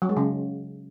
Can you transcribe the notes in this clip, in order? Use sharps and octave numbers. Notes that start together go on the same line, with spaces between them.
F#3
G#3
C#3